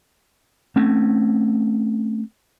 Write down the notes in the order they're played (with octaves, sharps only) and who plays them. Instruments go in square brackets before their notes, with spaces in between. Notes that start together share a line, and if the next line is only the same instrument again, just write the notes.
[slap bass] A3 C4 C#4